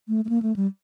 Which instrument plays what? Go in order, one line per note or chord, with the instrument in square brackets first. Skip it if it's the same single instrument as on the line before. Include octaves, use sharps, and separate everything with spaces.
[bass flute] A3
A3
A#3
A3
G3